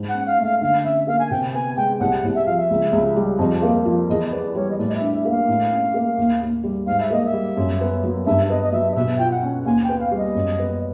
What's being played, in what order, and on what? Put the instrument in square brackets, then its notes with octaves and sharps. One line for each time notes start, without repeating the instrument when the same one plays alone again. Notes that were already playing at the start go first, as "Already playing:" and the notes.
Already playing: [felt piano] G#2
[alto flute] F#5
[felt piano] C#4
[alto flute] F5
[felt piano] A3 [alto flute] F5
[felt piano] D3 [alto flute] F5
[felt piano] C#4 [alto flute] E5
[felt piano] A#3 [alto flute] F5
[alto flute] G#5
[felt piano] C3 [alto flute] G5
[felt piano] B3 [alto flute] G#5
[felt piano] G#3 [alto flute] G5
[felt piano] C2 [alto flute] F#5
[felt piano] C2
[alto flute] E5
[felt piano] F3 [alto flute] F5
[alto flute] E5
[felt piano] C#2
C#2
G3
[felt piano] F2 [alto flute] D#5
[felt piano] A#3
F3
[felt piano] E2 [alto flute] D#5
[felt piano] B3 [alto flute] D5
[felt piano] G3 [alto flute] C#5
[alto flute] D#5
[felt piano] A2 [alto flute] D5
[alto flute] D#5
E5
[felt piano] D4
[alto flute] E5
[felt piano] A#3
[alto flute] F5
[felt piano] A2
C#4
A#3
D#2
D#2
G3
[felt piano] G#2 [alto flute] F5
[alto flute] E5
[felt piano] A#3 [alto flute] D#5
[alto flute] E5
[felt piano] G3
F#2
B3
F#3
[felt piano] G2 [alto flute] E5
[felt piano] B3 [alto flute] D#5
[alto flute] D#5
[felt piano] F#3 [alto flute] E5
[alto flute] D#5
[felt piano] B2 [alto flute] E5
[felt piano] F4 [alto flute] G5
[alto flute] F#5
[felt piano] C#4
[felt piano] D#2 [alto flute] G#5
[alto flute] G5
[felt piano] B3
[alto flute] F5
[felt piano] G3
[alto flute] D#5
[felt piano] F#2
B3